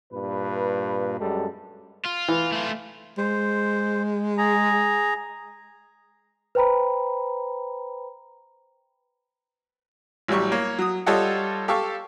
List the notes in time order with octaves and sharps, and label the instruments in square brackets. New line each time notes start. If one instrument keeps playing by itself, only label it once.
[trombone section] G2 A#2 B4
F#2 G3 G#3 A4
[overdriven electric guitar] F4
[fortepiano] E3
[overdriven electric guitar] A3 F4
[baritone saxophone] G#3 [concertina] C5
[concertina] G#4 A#5
[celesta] B4 C5 G5 A#5 B5
[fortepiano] A1 F#3 G3 C#6
A#3 C#5
F#3 D#6
G3 F4 A4 C#5 D#5 F#5
G4 A4 F5 C#6